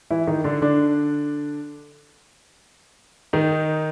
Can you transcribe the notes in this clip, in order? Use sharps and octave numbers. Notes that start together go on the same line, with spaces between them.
E3 E4
D#3 D#4
D3 D4
D3 D4
D#3 D#4